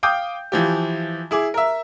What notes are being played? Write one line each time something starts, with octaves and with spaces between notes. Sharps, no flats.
F5 G5 D6 D#6 G6
E3 F3 G4
E4 G#4 D6
A#4 E5